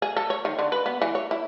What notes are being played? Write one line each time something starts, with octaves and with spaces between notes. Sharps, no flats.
G#4
A4
C#5
D#3
D3
B4
B3
E3
C#5
E4